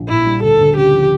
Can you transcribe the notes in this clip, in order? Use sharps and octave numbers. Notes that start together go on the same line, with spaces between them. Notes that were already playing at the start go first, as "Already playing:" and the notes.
Already playing: A#1 D4
A#2 E4
G3
D2 A4
D2
C#3 G4
F3